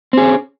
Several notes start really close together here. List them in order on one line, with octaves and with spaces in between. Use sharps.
C4 G#4 C#4